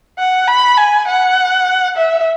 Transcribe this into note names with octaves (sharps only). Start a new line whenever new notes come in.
F#5
B5
G#5
F#5
E5